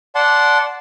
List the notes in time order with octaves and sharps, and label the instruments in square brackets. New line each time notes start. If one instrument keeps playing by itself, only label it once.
[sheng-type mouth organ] D5 F#5 A5 C6